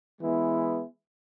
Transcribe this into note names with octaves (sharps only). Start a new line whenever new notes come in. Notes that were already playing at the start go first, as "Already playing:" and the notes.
E3 G#3 B3 E4